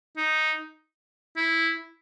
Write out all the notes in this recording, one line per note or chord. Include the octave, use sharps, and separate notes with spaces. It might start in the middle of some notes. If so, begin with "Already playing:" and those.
D#4
E4